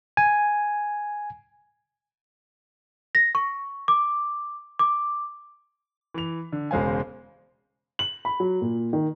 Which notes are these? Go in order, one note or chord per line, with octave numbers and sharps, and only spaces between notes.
G#5
A#6
C#6
D6
D6
E3 F7
D3
E1 C#3 G#3 C5 F5 G#5
F#7
B5
F#3
A#2
D#3